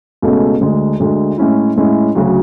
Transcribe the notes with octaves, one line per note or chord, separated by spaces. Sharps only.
C#2 B2 A3 C#4
D2 D3 G#3
D2 D3 G#3
A2 G#3 C#4 E4
A2 G#3 C#4 E4
D2 C#3 F#3